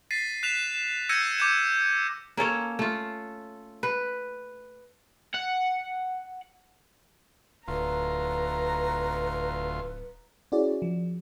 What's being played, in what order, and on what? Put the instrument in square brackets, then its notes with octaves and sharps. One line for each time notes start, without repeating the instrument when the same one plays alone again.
[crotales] A6 B6 C7 D#7
F#6 B6 E7 F7
E7
E6 G6 G#6 A#6 C#7 D#7
D6 G6 E7
[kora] A#3 C#4 A4 C#5
A3 F4
B4
[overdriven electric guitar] F#5
[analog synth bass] D1 [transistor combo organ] D2 F4 [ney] B4 [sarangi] A#5
[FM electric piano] C#4 E4 F#4 G#4 D5
F3